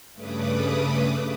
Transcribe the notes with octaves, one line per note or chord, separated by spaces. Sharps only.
G2 C#3 A3 B4 D6 D#6